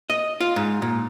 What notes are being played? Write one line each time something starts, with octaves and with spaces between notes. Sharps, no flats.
D#5
F4
G#2
A#2